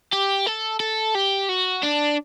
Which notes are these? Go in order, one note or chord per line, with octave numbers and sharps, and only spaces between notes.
G4
A4
A4
G4
F#4
D4